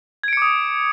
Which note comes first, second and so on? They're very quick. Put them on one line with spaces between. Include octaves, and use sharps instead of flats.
G#6 D7 C#7 D6 D#6